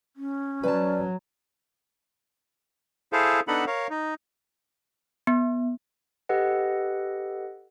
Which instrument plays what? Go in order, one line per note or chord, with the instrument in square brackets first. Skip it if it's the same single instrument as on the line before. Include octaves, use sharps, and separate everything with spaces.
[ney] C#4
[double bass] F#3 [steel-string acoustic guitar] B4 G#5 A5 [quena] D5
[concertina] E4 G#4 A4 C5 F5
B3 D4 D#4 A4 F#5 B5
A#4 C#5 F5
D#4
[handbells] B3
G4 A4 B4 D#5 F#5